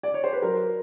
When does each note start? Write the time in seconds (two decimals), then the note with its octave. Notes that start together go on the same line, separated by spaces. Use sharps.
0.03 D5
0.14 C#5
0.24 C5
0.33 B4
0.42 F#3 A#4